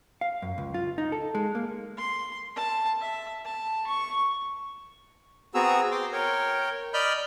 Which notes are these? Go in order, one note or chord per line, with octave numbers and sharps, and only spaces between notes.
F5
F#2
C#2
F4
D#4
A4
G#3
A#3
C6
A5
E5
A5
C#6
B3 C4 F#4 G#4 A#5 E6
G5 C6 D6
A#4 C#5 G5
D5 D#5 B5 F6 G6